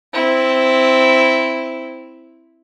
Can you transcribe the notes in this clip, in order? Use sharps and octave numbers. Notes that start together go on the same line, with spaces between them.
C4 E4